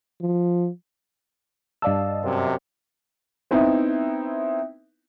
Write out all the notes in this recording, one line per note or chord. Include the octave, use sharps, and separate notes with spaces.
F3
G2 D5 D#5 F5 A5 E6
F#2 C3
B3 C4 D#4 E4